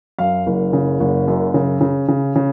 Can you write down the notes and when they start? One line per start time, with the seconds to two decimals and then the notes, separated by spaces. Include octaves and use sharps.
0.19 F#2 F5
0.47 F#1
0.73 C#3
1.00 F#1
1.28 F#2
1.54 C#3
1.81 C#3
2.08 C#3
2.36 C#3